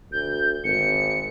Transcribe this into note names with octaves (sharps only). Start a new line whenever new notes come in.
D2 G6
G#1 C#7